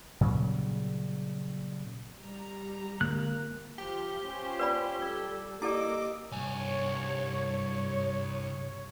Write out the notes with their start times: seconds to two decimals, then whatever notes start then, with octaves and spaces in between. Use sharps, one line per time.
0.21 A#2 C#3 F#3 G3
2.20 G3 A#5
3.01 D3 G#3 A#3 C4 F#6
3.78 F3 G4
4.25 C#4 F4 C5
4.60 B4 D5 B5
5.02 G3 A4 E6 G#6
5.62 A#3 E4 G4 A4 D5 D#5 D6 E6
6.32 C2 G2 C#5 G#5